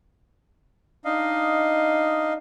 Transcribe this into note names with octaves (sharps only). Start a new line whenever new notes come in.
D4 D#4 D#5 F5